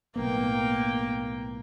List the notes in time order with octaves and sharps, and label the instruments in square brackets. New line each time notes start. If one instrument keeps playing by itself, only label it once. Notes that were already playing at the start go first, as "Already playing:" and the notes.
[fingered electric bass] B1 A2 B3 [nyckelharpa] A#3 G5